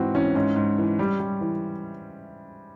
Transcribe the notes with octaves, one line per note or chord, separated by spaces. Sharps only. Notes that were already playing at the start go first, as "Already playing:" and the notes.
Already playing: G#2 E3 C4 F#4
E3 C#4
G#2 C#4
G#2
E3
G3
G3
E3